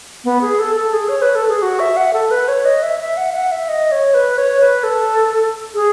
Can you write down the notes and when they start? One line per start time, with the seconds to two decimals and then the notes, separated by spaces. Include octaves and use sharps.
0.25 B3
0.42 G#4
0.59 A4
0.76 A4
0.93 G#4
1.09 C#5
1.22 B4
1.35 A4
1.49 G#4
1.62 F#4
1.80 E5
1.97 F#5
2.13 A4
2.31 B4
2.48 C#5
2.65 D#5
2.82 E5
3.00 E5
3.17 F#5
3.30 E5
3.34 F#5
3.51 E5
3.69 D#5
3.92 C#5
4.14 B4
4.38 C#5
4.61 B4
4.84 A4
5.75 G#4